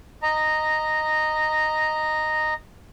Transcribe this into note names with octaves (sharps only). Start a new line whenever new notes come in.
D#5 A#5